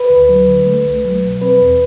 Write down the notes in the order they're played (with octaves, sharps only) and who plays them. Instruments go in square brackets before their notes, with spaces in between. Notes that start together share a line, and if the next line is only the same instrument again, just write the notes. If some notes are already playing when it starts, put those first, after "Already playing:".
Already playing: [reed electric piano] B4
D2
F#3
D3
A3
C2
F#3
B2
C4 B4
E2